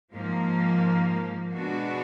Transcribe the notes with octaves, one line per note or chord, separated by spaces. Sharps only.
G#2 F3 A#3
B2 G#3 B3 D4 F#4